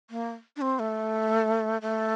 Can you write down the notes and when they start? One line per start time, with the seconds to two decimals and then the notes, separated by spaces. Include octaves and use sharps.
0.10 A#3
0.56 D4
0.61 C4
0.79 A3
1.82 A3